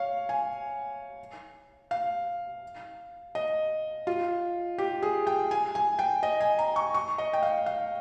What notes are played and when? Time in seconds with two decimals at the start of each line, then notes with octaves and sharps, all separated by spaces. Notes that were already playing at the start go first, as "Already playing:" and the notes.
Already playing: C#5 F5
0.29 G#5
1.91 F5
3.35 D#5
4.07 F4
4.78 G4
5.02 G#4
5.27 G5
5.51 G#5
5.75 G#5
5.99 G5
6.23 D#5
6.40 G#5
6.59 A#5
6.76 C#6
6.94 C#6
7.18 D#5
7.33 G5
7.43 F5
7.66 F5